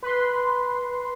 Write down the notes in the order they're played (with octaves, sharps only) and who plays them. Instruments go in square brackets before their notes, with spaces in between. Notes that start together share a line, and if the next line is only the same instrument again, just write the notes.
[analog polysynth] B4 C6